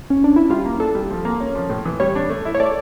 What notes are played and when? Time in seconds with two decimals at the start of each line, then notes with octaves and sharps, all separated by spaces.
0.10 C#4
0.24 D4
0.36 E4
0.49 G3 F4
0.65 A#3
0.80 D4 A4
0.95 G3
1.10 F3
1.25 A#3
1.40 C#4
1.55 F3
1.70 A2
1.85 E3
2.00 G3 C#5
2.15 D4
2.29 A3
2.45 E4
2.55 C#5
2.60 A4 D5